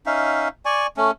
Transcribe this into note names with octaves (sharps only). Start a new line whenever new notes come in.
C#4 D#4 E5 F5
D5 G#5 C#6
A3 C#4